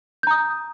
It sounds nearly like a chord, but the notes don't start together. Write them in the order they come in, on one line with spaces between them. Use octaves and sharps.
G6 A#5 D#6